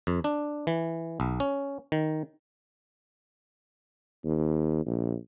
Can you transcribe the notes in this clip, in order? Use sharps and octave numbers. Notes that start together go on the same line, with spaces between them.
F2
D4
E3
B1
C#4
D#3
D#2
A#1